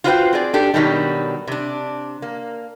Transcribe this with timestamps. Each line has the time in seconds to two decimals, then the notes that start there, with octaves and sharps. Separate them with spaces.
0.04 F4 F#4 B4 C5 D#5 G5
0.33 C4 G#4 D5
0.54 D4 G4 A4
0.74 B2 D#3 F#3 G3
1.48 C3 D4
2.22 A#3